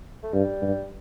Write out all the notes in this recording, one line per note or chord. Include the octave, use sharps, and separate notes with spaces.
A3
G2 G3
G2